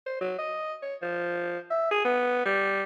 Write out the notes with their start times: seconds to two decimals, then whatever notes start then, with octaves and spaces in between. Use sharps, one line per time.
0.07 C5
0.21 F#3
0.39 D#5
0.82 C#5
1.03 F3
1.71 E5
1.91 G#4
2.05 B3
2.46 G3